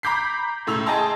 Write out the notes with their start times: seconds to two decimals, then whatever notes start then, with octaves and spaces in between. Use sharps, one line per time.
0.03 A#5 B5 D6 G6 B6 C7
0.67 C#2 A2 E6 F7
0.86 G#4 D#5 G5 A5 A#5 C6